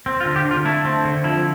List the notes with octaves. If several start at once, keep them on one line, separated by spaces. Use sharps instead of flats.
C4
F4
D3
G4
D3
F4
A3 E4
C4
D3
F3 E4